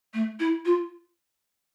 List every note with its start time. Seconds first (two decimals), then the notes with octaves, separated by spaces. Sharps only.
0.14 A3
0.40 E4
0.65 F4